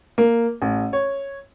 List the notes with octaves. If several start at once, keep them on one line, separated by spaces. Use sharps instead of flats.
A#3
A1
C#5